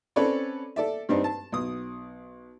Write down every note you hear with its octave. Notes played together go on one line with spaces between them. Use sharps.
C4 C#4 A4 B4 C#5 D5
A4 D5 E5
G2 C4 D4 D#4
A5
B1 D#6